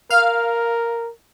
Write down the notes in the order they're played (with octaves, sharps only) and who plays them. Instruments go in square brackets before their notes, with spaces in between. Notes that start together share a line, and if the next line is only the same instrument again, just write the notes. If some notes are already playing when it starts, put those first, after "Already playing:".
[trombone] A#4 [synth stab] F5 F6